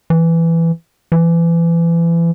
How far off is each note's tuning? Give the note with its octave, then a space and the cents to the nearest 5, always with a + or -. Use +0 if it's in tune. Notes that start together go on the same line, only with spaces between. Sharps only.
E3 +10
E3 +30